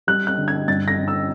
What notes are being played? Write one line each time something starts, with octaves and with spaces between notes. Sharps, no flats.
G3 F#6
F#6
D3
G#6
G2 A6
A#6
D3
E6